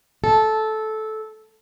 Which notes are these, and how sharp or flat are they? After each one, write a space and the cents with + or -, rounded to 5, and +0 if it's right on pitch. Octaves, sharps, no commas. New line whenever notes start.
A4 -15